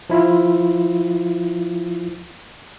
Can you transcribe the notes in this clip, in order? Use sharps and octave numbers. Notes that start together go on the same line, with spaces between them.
F3 E4 F4